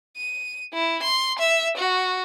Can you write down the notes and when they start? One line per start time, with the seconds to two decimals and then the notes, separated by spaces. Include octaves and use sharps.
0.17 D#7
0.74 E4
1.03 C6
1.39 E5
1.77 F#4